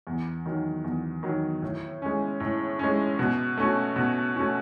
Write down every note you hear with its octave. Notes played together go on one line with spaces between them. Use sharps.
E2
D#3 F#3
E2
D#3 F#3
A2
G#3 C#4
A2
G#3 C#4
B2
A3 C#4 F#4
B2
A3 C#4 F#4